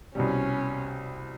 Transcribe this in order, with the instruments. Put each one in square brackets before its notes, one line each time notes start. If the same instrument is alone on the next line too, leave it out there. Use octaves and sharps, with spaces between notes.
[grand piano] C2 B2 G3 [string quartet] C#4